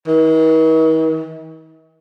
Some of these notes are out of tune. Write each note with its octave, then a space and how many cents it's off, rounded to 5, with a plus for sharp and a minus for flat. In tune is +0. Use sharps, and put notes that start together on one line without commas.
D#3 +45